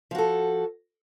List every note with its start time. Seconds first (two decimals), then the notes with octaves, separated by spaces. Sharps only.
0.11 F3
0.15 F#4
0.18 A4